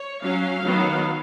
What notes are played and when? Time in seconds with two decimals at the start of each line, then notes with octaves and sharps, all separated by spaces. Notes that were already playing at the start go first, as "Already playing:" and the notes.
Already playing: C#5
0.23 F#3 C#4 F5
0.65 D#3 F#3 B3